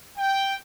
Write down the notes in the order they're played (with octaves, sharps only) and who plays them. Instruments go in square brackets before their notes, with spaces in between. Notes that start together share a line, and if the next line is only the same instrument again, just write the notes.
[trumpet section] G5